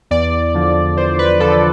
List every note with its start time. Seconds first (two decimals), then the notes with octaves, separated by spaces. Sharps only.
0.11 E2 D5
0.54 D3 F3
0.97 E2 C5
1.19 B4
1.40 D3 F3 A4